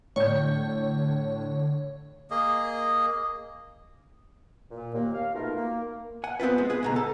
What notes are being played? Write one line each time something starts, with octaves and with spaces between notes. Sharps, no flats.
A2 D3 C#5 D5 G6
A#3 G#4 D#5
A#2
D#2 A#3
F5
B2 A3 D#4 F4 A#4
A#3
F#5 G#5
B3 C4 D4 F4 B4
G#3
G#4 B4
C#2 B2 A#5
A4